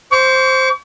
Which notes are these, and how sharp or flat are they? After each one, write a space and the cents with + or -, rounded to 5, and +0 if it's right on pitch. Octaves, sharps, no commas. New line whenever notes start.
C5 +0 C#6 +45